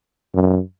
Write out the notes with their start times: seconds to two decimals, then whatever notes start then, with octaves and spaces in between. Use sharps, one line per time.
0.34 F#2